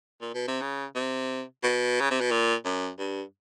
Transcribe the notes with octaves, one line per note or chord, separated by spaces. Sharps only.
A#2
B2
C3
C#3
C3
B2
C#3
C3
B2
A#2
F#2
G2